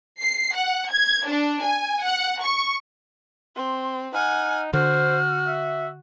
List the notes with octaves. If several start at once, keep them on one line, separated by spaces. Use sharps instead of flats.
C7
F#5
G#6
D4
G#5
F#5
C#6
C4 C6
D#4 F#5 G#5 F6
D3 F#4 C5 F6
E5